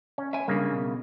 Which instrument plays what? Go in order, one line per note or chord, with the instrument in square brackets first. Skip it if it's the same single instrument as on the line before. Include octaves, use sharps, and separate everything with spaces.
[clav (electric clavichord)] C#4
[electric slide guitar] E5 G#5
[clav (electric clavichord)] C#3 A#3 [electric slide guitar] G3 D4
[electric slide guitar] B2